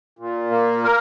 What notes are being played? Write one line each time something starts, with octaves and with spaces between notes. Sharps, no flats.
A#2
A#3
A#4